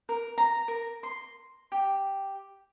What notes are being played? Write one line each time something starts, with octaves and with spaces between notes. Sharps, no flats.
A#4
A#5
A#4
C6
G4